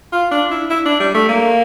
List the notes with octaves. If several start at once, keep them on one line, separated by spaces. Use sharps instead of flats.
F4
D4
E4
E4
D4
G3
A3
A#3